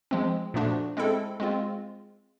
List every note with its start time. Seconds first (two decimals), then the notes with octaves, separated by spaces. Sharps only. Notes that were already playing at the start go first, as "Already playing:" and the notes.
0.11 F3 G#3 C4
0.54 A#2 F3 A3 D4 F#4
0.97 G#3 C4 E4 A4
1.40 G#3 C4 F4